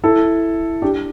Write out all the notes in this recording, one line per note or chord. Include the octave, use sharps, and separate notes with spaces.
E4 A4
D4 G4